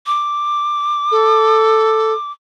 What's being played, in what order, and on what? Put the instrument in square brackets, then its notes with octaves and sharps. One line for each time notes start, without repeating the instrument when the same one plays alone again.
[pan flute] D6
[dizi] A4